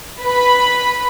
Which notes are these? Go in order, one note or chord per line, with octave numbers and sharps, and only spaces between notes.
B4 B5